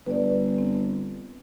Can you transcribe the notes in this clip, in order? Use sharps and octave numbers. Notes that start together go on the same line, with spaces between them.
G1 B4 D5
C4